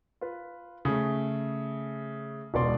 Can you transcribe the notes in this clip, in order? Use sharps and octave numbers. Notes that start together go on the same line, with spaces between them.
F4 B4
C#3 A3
E1 C#2 B2 B3 D5 C6